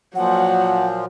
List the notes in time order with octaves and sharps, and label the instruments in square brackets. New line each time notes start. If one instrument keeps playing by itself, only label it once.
[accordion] A#2 F3 [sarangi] F#3 [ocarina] F#5